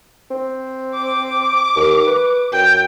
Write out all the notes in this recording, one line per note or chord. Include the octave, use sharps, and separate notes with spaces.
C4
D6
D#2
B4
F#2 G5